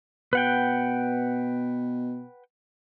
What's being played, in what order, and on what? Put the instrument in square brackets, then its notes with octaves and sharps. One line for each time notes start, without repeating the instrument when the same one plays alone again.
[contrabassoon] B2 [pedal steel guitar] B4 F#5 G5